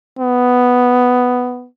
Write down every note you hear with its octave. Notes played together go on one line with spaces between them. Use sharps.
B3